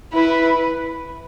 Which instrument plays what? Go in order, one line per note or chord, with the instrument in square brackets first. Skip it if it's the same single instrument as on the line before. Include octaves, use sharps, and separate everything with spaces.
[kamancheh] E4 [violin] B4